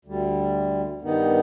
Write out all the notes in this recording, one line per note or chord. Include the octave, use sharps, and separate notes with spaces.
D2 D3 G3
G2 D#3 B3 D#4